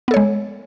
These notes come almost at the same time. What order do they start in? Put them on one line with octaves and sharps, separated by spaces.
B3 A4 C#5 G#3